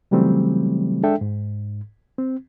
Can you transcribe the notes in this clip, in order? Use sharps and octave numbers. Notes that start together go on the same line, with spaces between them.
C#3 E3 F#3 G3 A3 C4
G#3 D4 A4 E5 G5
G#2
C4